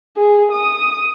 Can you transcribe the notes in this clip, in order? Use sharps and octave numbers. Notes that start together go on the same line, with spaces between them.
G#4
D#6